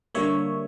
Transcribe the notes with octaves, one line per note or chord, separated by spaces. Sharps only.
D3 G3 A#3 C#5 E5